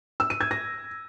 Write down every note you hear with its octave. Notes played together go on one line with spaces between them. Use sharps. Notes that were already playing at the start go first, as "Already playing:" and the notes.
E6
D#7
G#6
A#6